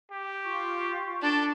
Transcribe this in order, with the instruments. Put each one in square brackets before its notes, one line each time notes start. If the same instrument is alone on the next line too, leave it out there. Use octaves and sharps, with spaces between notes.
[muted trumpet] G4
[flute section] F4 C#6
[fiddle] D4 A4 [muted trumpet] D5